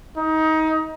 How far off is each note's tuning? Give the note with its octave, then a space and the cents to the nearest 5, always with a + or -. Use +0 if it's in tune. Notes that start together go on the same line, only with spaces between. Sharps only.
D#4 +25